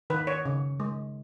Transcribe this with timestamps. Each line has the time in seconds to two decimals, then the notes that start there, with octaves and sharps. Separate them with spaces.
0.10 D#3 B4
0.27 C#5
0.45 C#3
0.80 G#3